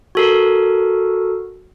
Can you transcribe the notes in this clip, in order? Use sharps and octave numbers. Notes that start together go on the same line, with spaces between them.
F#4 A4 A#4